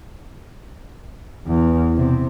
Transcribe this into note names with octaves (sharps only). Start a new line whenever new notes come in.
E2
C3